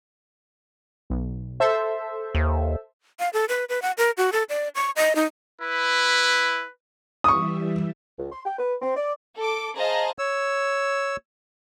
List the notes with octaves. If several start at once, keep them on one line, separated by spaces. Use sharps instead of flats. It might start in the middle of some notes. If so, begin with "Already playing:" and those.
B1
A4 C5 E5
D#2
F5
A4
B4
B4
F#5
A#4
F#4
A4
D5
C#6
D#5
D#4
E4 B4
E3 G3 E5 C#6 D#6
C#2
C6
G5
B4
C4
D5
A4 D6
G#4 C5 D#5 F5 A5 A#5
C#5 E6